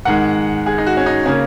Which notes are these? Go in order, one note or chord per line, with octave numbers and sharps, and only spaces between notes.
G#2 D#3 G#3 F#5
G#4
D#4
F#4
C#4
D#4
C#3 A#3 C#4